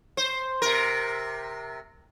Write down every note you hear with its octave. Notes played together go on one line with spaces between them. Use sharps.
C5
C3 A#4